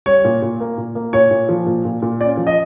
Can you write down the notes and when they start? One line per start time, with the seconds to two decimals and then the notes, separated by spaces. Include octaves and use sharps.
0.06 G3 C#5
0.25 A#2
0.42 A#2
0.60 A#3
0.78 A#2
0.95 A#3
1.13 A#2 C#5
1.31 A#2
1.49 F3
1.66 A#2
1.85 A#2
2.02 A#2
2.21 C#4 D5
2.37 F3
2.47 D#5